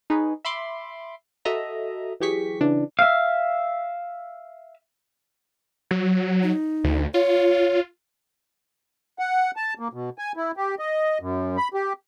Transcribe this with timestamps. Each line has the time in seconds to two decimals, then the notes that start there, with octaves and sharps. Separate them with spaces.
0.10 D#4 G#4 B4 C#5
0.45 E5 B5 C6 D6
1.45 F#4 A4 D#5 E5 A#5
2.20 E3 F#3 G4 G#4 C#6 B6
2.61 C#3 E3 D4
2.99 E5 F5
5.91 F#3
6.43 D#4
6.84 D2
7.14 F4 C#5
9.19 F#5
9.57 A5
9.79 A#3
9.93 B2
10.18 G#5
10.37 E4
10.57 G4
10.79 D#5
11.21 F#2
11.57 B5
11.74 G4